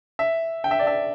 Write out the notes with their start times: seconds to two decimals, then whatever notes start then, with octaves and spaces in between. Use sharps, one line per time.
0.19 E5
0.64 G5
0.71 E5
0.79 D5
0.87 E5